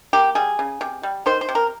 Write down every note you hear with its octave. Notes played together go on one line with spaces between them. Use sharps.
A#3 G4
G3 G#4
C#3
C3
G3
D#3 C5
C5
C3
A#4